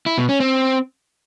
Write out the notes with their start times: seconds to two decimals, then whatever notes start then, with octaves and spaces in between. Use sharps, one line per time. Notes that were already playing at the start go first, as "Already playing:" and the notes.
0.06 E4
0.18 B2
0.29 C#4
0.40 C4